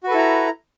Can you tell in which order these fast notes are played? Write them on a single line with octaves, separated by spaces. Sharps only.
F#4 B4 A4 E4 A#5